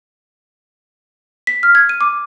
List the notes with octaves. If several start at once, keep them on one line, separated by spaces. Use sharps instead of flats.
B6
F6
G#6
D#7
D6